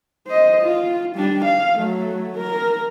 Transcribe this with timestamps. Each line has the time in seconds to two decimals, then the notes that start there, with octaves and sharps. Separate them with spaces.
0.27 C5 D#5
0.61 F4
1.16 G3 D4
1.45 F5
1.78 F#3 A3
2.38 A#4